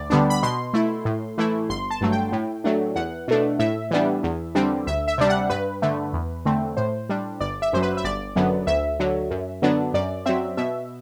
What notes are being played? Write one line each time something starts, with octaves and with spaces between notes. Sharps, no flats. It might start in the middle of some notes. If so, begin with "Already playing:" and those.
Already playing: D2 D5
D3 G3 B3 D4
B5
B2 C6
A3 E4
A2
E3 A3 E4
G1 C6
A5
G2 F#3 A3
G5
A2
F#3 A3 D4
E2 F#5
B2 A3 D4
A2 E5
E3 G3 B3 D4
E2
D3 G3 C4
D2 E5
E5
C3 G3 D4
F#5
G2 B4
D3 A3
E2
D3 A3 C4
A2 C5
G3 D4
G1 D5
E5
F#2 F#3 C5
B4
E5
G1 D5
F#2 D3 F#3 B3
D2 E5
D3 F#3
F#2
D3 F#3 B3 D4
F#2 D5
F#3 C4 E5
B2 E5